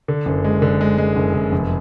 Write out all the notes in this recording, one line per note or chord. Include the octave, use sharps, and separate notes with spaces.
D3
F#1
G#3
D3
G#3
G#3
F#1
F#1
F1